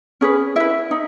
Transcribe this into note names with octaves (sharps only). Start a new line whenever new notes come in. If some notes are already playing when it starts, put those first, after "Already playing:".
C#4 G#4 B4
E4 B4 E5
D#4